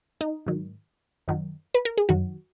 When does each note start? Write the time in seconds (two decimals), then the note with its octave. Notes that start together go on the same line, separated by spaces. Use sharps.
0.21 D#4
0.46 G#2 D#3 F#3
1.28 F#2 D#3 F#3
1.74 B4
1.85 A#4
1.98 G#4
2.09 F#2 D#3 F#3 F#4